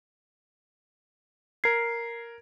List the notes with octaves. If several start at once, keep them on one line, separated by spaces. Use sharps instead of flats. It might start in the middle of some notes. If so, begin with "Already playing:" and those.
A#4 G#6 C7